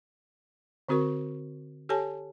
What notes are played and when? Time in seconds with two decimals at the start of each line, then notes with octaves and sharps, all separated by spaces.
0.89 D3 C4 F#4 A#4 C#6
1.89 G4 A4 C#5 G#5 A5